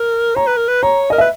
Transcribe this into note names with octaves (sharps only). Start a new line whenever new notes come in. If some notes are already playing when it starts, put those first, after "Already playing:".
Already playing: A#4
C#5 A#5
B4
A#4
B4
C#5 A#5
A#4 D#5
B4 E5